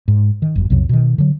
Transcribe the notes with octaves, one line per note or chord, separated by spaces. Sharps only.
G#2
D#3
G1 F#2
B1 F2 C3 F#3
B2 D#3
D3 F#3